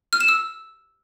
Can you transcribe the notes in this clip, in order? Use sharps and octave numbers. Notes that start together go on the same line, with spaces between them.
F6
E7
E6